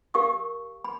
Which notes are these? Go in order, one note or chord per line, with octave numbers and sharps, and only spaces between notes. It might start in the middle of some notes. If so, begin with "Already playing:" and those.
G4 A#4 F5 C#6 D#6
B5